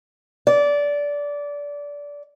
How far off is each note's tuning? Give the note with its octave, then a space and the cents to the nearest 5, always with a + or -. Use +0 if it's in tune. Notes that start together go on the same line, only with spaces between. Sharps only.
D5 -20